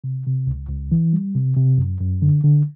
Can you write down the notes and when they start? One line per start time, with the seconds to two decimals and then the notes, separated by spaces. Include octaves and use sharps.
0.04 C3
0.26 C3
0.47 C#2
0.69 C#2
0.92 E3
1.13 G3
1.35 C3
1.57 C3
1.78 F#2
2.01 F#2
2.22 D3
2.44 D3